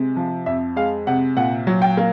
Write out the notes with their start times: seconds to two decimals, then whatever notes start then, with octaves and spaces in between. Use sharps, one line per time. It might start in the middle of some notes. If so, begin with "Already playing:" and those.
Already playing: C3 G#3
0.17 F3
0.46 F2 E5
0.76 G#3 F5
1.07 C3 F#5
1.37 A#2 F#5
1.67 F#3
1.82 G5
1.97 A#3